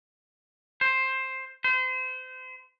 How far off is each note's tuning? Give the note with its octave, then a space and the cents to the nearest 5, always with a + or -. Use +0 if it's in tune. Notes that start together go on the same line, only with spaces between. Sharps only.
C5 +10
C5 -30